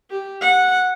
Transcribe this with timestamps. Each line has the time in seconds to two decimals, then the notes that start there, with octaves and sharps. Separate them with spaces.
0.10 G4
0.41 F#5